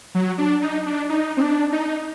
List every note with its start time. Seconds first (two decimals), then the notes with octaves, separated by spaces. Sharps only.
0.15 F#3
0.38 D4
0.62 D#4
0.86 D4
1.09 D#4
1.37 C4
1.41 D4
1.72 D#4